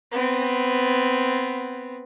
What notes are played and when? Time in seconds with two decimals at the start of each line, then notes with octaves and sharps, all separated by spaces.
0.12 B3 C4